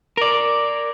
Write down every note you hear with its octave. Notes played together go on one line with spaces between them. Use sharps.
A#4 D5